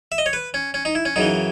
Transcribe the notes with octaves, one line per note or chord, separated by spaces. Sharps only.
E5
D#5
C#5
B4
C#4
C#4
D#4
E4
C#4
F#2 C#3 E3 D#4